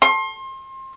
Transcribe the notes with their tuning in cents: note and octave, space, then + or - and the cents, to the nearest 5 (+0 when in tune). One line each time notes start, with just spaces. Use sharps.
C6 +30